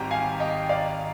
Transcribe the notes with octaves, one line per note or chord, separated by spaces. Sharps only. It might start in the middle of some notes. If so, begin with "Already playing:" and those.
Already playing: G#1 G#2 G3 G5 A#5
F5 G#5
D#5 G5
D5 F5